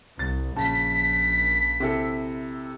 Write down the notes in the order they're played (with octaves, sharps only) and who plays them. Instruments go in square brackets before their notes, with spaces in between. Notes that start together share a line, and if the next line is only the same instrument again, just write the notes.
[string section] C2 [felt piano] A6
[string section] A#1 B6 [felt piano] C#3 A5
[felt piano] C3 E4 A4